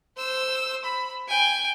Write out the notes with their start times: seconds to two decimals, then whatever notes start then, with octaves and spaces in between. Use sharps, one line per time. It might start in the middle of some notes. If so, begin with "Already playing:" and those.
0.17 C5 E6
0.85 B5
1.28 G5 G#5